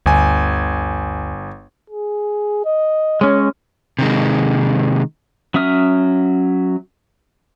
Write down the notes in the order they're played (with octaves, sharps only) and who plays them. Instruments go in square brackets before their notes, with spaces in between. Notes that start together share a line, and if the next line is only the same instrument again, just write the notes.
[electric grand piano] G1 G#5 [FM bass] D2
[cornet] G#4
D#5
[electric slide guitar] G#3 C#4 [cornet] C#5
[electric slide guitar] C3 D#3 G#3
[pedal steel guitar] F#3 C#4 E5 D#6 F6